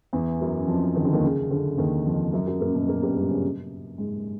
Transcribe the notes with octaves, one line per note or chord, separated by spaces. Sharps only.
E2 E3
F#2 F#3
F2 F3
D#3
D3
D#2 D#3
C#3
D3
D#2 D#3
F2 F3
F#2 F#3
F#2 F#3
A#2 A#3
B2 B3
A#2 A#3
G2 G3
G2 G3
C#3 C#4
G#2 G#3